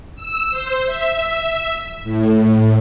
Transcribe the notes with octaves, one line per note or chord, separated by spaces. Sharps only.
E6
C5
E5
A2